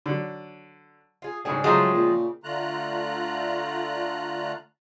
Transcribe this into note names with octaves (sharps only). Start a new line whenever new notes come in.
D3 F#3
F4 G#4
D2 G#2 C#3 G3 D4 G#4
C#3 F3 F#3 G#3 A3 F5 G5 A#5
A#2
D3 A3 F4 A#5 F#6